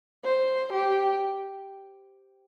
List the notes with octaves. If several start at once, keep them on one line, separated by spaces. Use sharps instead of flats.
C5
G4